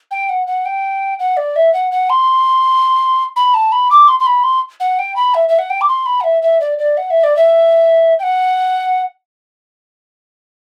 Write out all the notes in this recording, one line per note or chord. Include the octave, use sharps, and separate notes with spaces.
G5
F#5
F#5
G5
F#5
D5
E5
F#5
F#5
C6
B5
A5
B5
D6
C6
C6
B5
C6
F#5
G5
B5
E5
E5
F#5
G5
D6
C6
B5
F#5
E5
E5
D5
D5
F#5
E5
D5
E5
G5
F#5